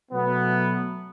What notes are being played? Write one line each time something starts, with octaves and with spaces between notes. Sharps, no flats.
B2 F#3 A3 B3